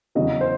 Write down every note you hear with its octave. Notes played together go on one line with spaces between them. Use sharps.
E2 C#3 F#3 D#5
C5